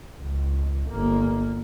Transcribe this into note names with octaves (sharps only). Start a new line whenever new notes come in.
C#2
G1 A#3